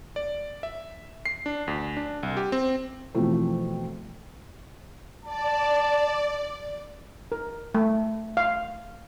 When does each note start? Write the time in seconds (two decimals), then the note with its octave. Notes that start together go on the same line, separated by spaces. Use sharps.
0.16 D5
0.63 E5
1.26 C7
1.46 D4
1.68 D2
1.97 D4
2.23 C2
2.37 G4
2.52 C4
3.14 B2 E3 F3 A3 C4
5.25 D5 A5
7.32 A#4
7.75 A3
8.37 F5